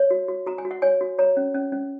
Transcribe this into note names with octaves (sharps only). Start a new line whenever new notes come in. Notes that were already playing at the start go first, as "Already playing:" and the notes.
Already playing: C#5
F#4
F#4
F#4 A#5
G#5
F#4
F#5
C#5 G#5
F#4
C#5 A#5
C#4
C#4
C#4